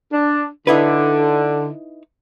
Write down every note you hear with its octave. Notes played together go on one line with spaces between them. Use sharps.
D4
D3 D#4 E4 B4